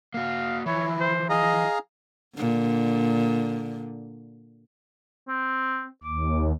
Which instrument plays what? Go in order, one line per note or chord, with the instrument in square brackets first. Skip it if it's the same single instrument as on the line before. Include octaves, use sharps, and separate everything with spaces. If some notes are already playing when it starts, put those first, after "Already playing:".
[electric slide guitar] A#3 F#4 [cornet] F5
[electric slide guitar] E3 F3 [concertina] E4 [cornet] C#5
[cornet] C5
[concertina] G#4 F5 A#5 [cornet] D#5
[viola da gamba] A#2 D3
[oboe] C4
[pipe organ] D#2 [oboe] D6